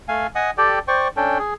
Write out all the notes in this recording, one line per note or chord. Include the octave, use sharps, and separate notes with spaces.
A3 F5 G#5
D#5 F#5 G#5 D#6
G4 A4 D5 G5
C5 D5 G5 C#6
C#4 D4 A4 G5
G#4